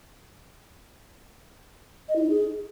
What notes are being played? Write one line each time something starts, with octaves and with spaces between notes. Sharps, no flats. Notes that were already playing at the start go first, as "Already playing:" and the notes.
D#5
E4
D#4
G#4